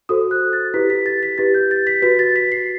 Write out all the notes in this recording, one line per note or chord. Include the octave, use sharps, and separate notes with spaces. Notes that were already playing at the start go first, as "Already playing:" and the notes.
F#4 A4 C5 D#6
F#6
A6
E4 G4 B4 B6
B6
A6
B6
E4 G4 B4 A6
G6
A6
B6
F#4 B4 B6
A6
B6
C7